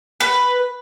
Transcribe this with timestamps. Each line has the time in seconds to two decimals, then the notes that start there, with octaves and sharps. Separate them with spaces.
0.20 B4